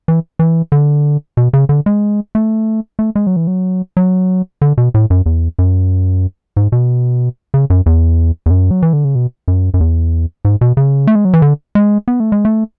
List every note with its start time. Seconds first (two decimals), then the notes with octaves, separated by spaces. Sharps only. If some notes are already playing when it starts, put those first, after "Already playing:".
0.08 E3
0.39 E3
0.72 D3
1.37 B2
1.53 C#3
1.69 D3
1.86 G#3
2.35 A3
2.99 A3
3.15 G#3
3.27 F#3
3.36 E3
3.47 F#3
3.97 F#3
4.62 D3
4.78 B2
4.94 A2
5.10 F#2
5.26 E2
5.59 F#2
6.57 G#2
6.72 B2
7.54 C#3
7.70 F#2
7.86 E2
8.46 E2
8.51 F#2
8.71 F#3
8.82 E3
8.93 D3
9.05 C#3
9.15 B2
9.48 F#2
9.74 F#2
9.80 E2
10.45 G#2
10.61 B2
10.77 C#3
11.07 A3
11.15 G#3
11.25 F#3
11.34 E3
11.42 D3
11.75 G#3
12.08 B3
12.20 A3
12.32 G#3
12.45 A3